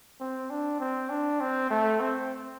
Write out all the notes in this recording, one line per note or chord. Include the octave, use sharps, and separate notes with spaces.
C4
D4
C4
D4
C4
A3
C4